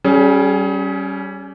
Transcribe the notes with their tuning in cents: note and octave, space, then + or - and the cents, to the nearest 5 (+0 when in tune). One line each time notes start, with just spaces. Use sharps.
G3 -20 C#4 +0 G#4 +30